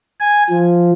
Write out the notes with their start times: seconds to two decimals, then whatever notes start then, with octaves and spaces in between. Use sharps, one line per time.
0.20 G#5
0.50 F3